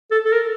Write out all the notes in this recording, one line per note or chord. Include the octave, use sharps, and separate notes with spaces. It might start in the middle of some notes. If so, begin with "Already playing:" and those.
A4
A4
A#4